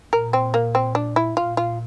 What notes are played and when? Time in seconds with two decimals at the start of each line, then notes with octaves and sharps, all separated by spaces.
0.13 A#2 A#4
0.33 C4
0.54 A#3
0.75 C4
0.95 D4
1.16 E4
1.37 A#2 F4
1.57 F4